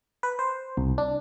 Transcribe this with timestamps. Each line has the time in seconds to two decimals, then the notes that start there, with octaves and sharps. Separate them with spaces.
0.23 B4
0.39 C5
0.77 C2
0.98 D4